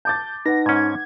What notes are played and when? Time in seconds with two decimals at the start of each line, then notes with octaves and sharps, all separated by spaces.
0.05 A5 D6 G6 A6
0.46 D#4 B4 F#5 A#6
0.66 G#2 C#4 G#6